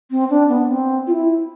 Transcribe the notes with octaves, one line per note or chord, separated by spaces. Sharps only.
C4
D4
B3
C4
F4
E4